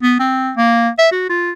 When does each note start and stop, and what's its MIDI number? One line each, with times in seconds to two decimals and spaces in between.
0.02 0.19 59
0.19 0.52 60
0.57 0.89 58
0.98 1.10 76
1.11 1.29 66
1.29 1.51 65